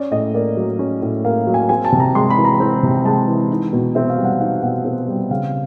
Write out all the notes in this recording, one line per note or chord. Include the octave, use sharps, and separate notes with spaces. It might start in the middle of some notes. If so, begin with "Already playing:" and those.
Already playing: C#4 D5
A2 D#5
A#3 D5
F#3
C#4
A2
A#3 F5
F#3
G#5
C4 G#5
A5
C3
A#5
G#3 C6
B5
E3
A#5
C4
C3
G#3 A5
E3
D#4
B2
C4 E5
F5
G3
F#5
D#4 F5
B2 F#5
C4
G3
C#3 F5